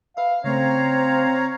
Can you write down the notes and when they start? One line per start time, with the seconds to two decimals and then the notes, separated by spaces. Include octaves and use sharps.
0.17 B4 E5 F5
0.44 C#3 A3 C4 C#5 F5 A#5